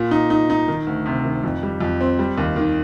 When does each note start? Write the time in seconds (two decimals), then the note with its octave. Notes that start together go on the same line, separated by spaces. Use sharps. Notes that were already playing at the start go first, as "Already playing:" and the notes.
Already playing: A#2
0.11 D#4
0.30 D#4
0.50 D#4
0.68 D#3
0.87 D2
1.06 C3
1.24 D#3
1.44 F2
1.63 G3
1.81 F2
2.01 C4
2.19 G3
2.37 D#2
2.56 D#3